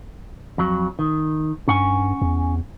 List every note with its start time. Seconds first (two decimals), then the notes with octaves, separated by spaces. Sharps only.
0.58 F2 F#3
0.99 D#3
1.68 G2 C#4 F#5 G#5
2.22 E2